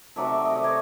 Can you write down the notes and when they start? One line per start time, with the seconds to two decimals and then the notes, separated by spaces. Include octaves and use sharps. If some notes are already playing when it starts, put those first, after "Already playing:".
0.16 C3 D#3 F#3 A3 D5 E5
0.45 D#5
0.55 D5
0.64 C#5 D#5